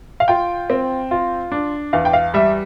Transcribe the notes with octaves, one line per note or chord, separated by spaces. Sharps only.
F5
F4 G5
C4
F4
D4
E2 F5
G5
F5
G3 E5